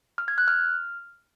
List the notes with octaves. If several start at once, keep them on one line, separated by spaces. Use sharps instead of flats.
F6
G#6
F#6
F6